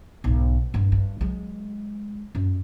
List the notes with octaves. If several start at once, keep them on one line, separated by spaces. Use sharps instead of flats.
B1 G#2
G2 D4
G2
F#3 G#3
F#2